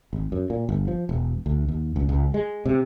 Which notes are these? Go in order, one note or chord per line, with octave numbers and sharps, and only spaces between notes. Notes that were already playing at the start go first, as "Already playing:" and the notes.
G#1
F#2
A#2
G1
F3
E1
D2
D#2
C#2
C#2
G#3
C3